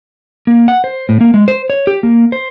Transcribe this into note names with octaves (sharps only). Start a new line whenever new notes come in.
A#3
F#5
C5
A2
A#3
G#3
C5
C#5
G4
A#3
C5